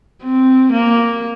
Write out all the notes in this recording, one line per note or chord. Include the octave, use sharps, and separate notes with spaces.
C4
A#3